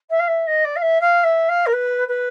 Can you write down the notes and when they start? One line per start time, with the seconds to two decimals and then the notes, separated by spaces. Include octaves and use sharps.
0.10 E5
0.19 F5
0.27 E5
0.47 D#5
0.64 D5
0.76 F5
0.82 E5
1.01 F5
1.23 E5
1.48 F5
1.66 A#4
1.72 B4
2.08 B4